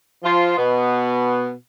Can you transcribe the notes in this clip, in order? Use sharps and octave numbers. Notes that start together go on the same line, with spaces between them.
F3 F4
B2 B3